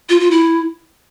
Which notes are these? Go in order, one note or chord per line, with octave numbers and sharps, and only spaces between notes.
F4
F4
E4